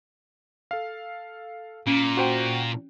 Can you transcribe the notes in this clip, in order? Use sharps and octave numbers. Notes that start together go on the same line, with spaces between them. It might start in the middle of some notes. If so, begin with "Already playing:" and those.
A4 F5
A#2 C#4
F#4 C5 G5